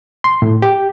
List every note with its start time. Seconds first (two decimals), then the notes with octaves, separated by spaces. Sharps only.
0.24 C6
0.42 A2
0.62 G4